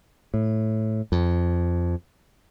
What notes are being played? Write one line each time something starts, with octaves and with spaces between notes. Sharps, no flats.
A2
F2